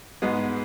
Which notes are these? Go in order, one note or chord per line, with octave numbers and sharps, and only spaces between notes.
G#2 G#3 B3